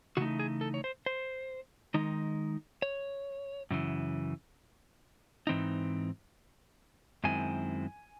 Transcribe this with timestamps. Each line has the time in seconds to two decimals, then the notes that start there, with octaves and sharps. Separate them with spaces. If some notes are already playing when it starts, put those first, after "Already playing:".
0.17 C#3 E3 A3 D#4 F#4
0.39 G#4
0.61 A4
0.74 C#5
0.84 C5
1.06 C5
1.94 D#3 G#3 D#4
2.82 C#5
3.71 F#2 C#3 E3
5.47 G#2 E3 C4 D#4
7.24 F#2 D#3 G#3 C4 E4 G#5